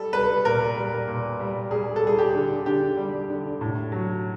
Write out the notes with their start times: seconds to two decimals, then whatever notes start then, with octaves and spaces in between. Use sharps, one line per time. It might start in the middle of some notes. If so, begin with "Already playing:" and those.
Already playing: G3 A4
0.13 G3 B4
0.45 A#2 A#4
0.76 G3
1.08 A#2
1.39 G3
1.71 G3 G#4
1.96 A4
2.03 G3 G#4
2.19 G4
2.35 D3
2.66 D3 G4
2.97 G3
3.30 D3
3.61 A2
3.92 F#3